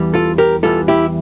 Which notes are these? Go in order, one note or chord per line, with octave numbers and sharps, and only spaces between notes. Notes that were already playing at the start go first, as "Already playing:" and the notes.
Already playing: E2 E3 G3
F4 A4
G4 A#4
E2 E3 G3 F4 A4
E4 G4